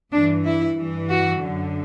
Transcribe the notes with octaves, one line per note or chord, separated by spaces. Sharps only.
G2 E3 D4
E4
G2 E3
F#4
F#2 D3